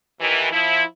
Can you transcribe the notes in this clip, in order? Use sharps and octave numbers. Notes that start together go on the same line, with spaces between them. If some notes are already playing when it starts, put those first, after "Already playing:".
D#2 E3
F3 E4